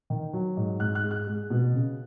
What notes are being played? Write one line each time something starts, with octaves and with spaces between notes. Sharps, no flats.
D#3
F#3
G#2
G#2 F#6
F#6
G#3
F#6
G#3
B2
C#3